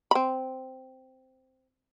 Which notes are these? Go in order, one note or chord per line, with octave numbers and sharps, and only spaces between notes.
C4 B5